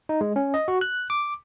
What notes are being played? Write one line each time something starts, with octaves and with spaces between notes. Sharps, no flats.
D#4
G#3
C#4
D#5
F#4
F#6
D6